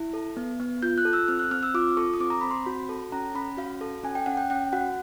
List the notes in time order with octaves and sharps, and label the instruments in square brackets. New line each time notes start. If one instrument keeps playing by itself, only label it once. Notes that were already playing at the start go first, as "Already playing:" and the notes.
Already playing: [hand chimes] E4
A4
B3
B3
F4 G6
F#6
A4
E6
C4 F6
F#6
C4 F6
E6
F4 D6
A4 C#6
D#6
C4 D6
A#5
C4 B5
C6
F#4 B5
A4
C#4 A#5
C#4 B5
F#4 F5
A4
C#4 G#5
G5
C#4 F#5
G5
C#4 G5
F#4 F#5